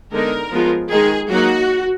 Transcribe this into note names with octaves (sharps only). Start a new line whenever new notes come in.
D3 G#3 B3 D#4 A#4
F3 G#3 B3 F4
D#3 G#3 D#4 G#4
F#3 A#3 D#4 F#4